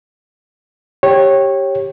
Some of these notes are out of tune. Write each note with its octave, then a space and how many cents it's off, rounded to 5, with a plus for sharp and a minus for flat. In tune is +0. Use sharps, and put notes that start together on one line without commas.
G4 +0 C#5 -20